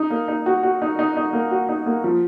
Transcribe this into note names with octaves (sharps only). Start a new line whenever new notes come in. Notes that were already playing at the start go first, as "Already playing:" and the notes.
Already playing: D#4
A#3
D#4
F#4
F#4
D#4
D#4
D#4
A#3
F#4
D#4
A#3
F3